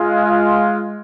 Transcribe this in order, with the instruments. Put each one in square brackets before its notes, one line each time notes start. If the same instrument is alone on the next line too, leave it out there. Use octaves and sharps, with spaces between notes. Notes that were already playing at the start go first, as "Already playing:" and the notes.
Already playing: [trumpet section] G#3 F4